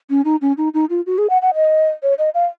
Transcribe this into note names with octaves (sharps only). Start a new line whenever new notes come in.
C#4
D#4
C#4
D#4
D#4
F4
F#4
G#4
F#5
F#5
D#5
C#5
D#5
F5